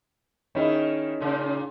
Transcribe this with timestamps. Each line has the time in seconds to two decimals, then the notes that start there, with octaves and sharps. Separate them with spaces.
0.55 D#3 C#4 D#4 E4 G#4
1.21 A#2 C#3